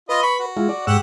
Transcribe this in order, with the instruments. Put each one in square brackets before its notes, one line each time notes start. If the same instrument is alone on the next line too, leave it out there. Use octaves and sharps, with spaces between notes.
[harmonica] F4 D#5 [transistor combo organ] B4
[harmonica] B5 C#6
F#4
[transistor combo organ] G#3 E4 F4
D5
[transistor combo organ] G#2 C#6 E6 [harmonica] G4 F#5